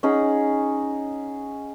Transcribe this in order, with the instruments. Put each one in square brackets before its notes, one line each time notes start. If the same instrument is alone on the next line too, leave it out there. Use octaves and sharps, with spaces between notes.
[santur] C#4 D#4 G#4 F#5